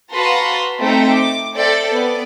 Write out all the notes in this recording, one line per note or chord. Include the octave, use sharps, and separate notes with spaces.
F#4 B4 F5 A5 A#5 C6
A3 C4 D#4 E5 G5
D6
A4 C5 D5 E5 G5
B3 D5